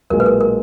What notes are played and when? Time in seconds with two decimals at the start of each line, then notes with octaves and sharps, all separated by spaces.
0.10 B1 A#2 G#3 A#4
0.20 B4
0.26 A#4
0.41 A#4